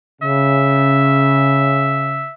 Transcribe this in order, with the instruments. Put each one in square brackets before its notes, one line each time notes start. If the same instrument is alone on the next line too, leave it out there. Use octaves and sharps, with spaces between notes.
[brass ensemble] C#3 [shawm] E5